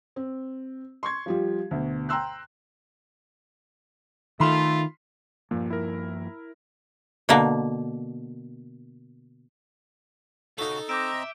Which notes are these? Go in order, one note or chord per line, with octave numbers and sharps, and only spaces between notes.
C4
C6 C#6 G#6
F3 G3 F4
D2 B2
G5 A#5 C6 E6 F#6
D#3 A3 F4 B5 C6
G2 A#2 F3 A#3
E4 A#4
B2 D3 A#3
C#3 D#4 F#4 A4 G7
C4 D#5 E5 A#5 D6 G6 D7